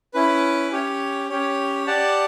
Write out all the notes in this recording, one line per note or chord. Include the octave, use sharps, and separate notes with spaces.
C#4 E4 B4
C#4 G4 C#5
C#4 G4 C#5
G4 D5 F#5 A5